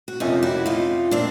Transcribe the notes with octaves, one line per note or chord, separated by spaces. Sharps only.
F#4
F2 C3 F3 A#3 C#4 D#4 F4
E4 F#4
D#4 F4
A#2 F3 A#3 C4 D4